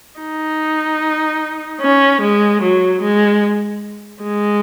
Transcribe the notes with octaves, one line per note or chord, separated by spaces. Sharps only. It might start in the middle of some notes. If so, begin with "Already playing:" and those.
D#4
C#4
G#3
F#3
G#3
G#3